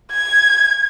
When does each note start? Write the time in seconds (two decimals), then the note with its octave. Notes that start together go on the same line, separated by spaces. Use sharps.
0.12 G#6